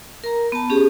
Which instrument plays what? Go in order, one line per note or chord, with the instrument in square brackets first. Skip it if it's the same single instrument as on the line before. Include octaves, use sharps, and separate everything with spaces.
[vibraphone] A#4 A#5
B3 A5
C#4 G4 G#4